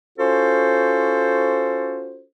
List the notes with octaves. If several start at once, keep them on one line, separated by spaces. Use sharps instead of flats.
C#4 F4 F#4 A4 C5